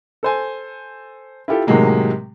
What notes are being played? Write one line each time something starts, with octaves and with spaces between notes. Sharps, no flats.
A4 C5 G#5
E4 F4 G4 A4
A2 C3 D#3 F#3 G#3 A#3